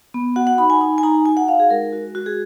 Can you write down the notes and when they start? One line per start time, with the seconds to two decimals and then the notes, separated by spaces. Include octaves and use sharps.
0.14 B3
0.36 F#4 F#5
0.47 F#5
0.58 D#4 B5
0.70 G#5
0.81 D#4 G#5
0.98 G#5
1.03 D#4 A#5
1.26 F#4 G#5
1.37 F#5
1.48 D#4 F5
1.60 G#4
1.70 G#3 A#4
1.93 F#4
2.15 G#3 F#4
2.26 G#4